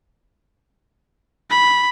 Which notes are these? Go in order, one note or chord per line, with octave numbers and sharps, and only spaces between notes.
B5